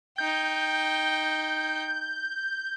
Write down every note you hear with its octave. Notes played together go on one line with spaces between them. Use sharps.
D#4 G5 G6